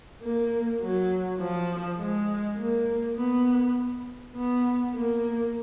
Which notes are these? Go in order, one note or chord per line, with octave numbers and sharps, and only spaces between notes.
A#3
F#3
F3
G#3
A#3
B3
B3
A#3